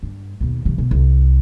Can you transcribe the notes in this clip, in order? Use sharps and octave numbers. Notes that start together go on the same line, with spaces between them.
G2
D#2 B2
C3 E3
B2
C2